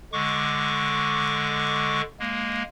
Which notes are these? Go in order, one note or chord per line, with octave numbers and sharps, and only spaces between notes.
D3 G#3 C#6 D6
G#3 A#3